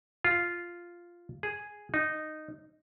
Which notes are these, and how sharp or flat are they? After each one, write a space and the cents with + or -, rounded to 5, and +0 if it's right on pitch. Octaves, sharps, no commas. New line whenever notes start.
F4 -5
G#4 +0
D#4 -10